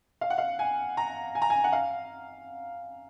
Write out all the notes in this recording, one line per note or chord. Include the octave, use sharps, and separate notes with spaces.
F5
F#5
F5
G#5
A#5
G#5
A#5
G#5
F#5
F5